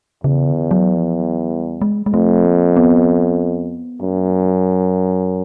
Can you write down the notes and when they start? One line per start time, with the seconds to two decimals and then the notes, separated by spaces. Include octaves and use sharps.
0.24 E2 C#3
0.48 D3
0.71 F#3
0.95 F3
1.19 F#3
1.51 G3
1.82 G#3
2.06 G#3
2.13 F2 A3
2.45 A#3
2.77 B3
4.02 F#2 A#3